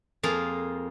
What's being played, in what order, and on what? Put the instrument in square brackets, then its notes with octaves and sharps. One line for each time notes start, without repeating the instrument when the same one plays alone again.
[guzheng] F2 A#3 F4 G#4 A#5